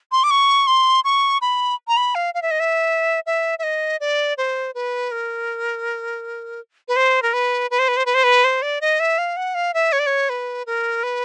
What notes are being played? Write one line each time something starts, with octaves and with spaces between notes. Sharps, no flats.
C6
D6
C#6
C6
C#6
B5
A#5
B5
F5
F5
E5
D#5
E5
E5
E5
D#5
D5
C5
B4
A#4
B4
C5
A#4
B4
B4
C5
B4
C5
B4
C5
B4
C5
D5
D#5
E5
F5
F#5
F5
E5
C#5
D5
C#5
B4
A#4
B4